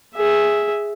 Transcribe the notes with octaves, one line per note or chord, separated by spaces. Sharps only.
G#4 E5